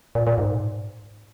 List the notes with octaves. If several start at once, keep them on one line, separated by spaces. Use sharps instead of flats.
A#2
A#2
G#2